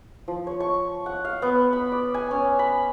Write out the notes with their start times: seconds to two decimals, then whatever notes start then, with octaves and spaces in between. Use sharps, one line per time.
0.28 F3
0.47 C#5
0.60 C#6
1.06 F#5
1.25 F5
1.42 B3
1.73 B5
1.92 D5
2.14 G#5
2.31 C#4
2.59 B5